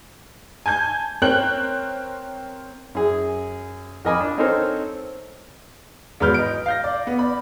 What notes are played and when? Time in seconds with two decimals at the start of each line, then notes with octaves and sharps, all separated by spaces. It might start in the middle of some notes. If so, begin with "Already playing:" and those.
0.66 G#5 A5 G6 G#6
1.22 C4 A#4 C#5 G5 F#6 F#7
2.95 F#2 G#4
4.05 F2 A#4 D#5 G#5 B5 D6
4.20 D4
4.38 C4 D#4 A4 A#4 C5 C#5
6.20 E2 G#2 F#3 B4 F6 G6
6.34 D#5 D7
6.66 F5 G6 A#6
6.84 D5
7.07 B3
7.19 D5 B5